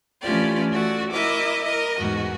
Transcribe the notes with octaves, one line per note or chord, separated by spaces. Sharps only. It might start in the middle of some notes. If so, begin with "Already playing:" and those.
E3 A3 C#4 F4 G4 D5
A3 F#4 D5
E4 A#4 D#5 E5 D6
A#4 D#5
E2 G#2 F#4